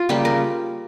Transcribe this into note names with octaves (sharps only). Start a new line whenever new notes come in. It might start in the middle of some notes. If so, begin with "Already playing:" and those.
Already playing: F4
C#3 G3 A#3 G4
A#4